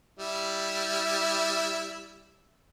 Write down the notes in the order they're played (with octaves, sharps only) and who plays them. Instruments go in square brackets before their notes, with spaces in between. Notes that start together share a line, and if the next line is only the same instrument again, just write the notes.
[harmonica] G3 E4